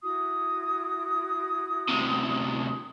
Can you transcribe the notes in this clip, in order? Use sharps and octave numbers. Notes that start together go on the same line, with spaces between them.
E4 F#4 D#6
D2 C3